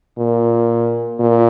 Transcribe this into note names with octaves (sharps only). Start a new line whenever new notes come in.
A#2
A#2